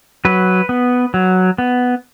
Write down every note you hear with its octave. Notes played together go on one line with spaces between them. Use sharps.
F#3 B4
B3
F#3
B3